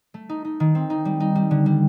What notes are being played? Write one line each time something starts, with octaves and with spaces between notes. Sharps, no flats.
A3
D#4
D#4
D#3
C4
D#4
G3
D#4
G3
D3
G3